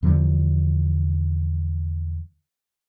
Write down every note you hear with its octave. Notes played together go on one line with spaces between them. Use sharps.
E2 D3 F3 G3